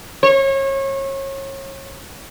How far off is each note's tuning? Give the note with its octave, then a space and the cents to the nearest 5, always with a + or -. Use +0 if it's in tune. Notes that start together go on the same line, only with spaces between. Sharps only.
C#5 -30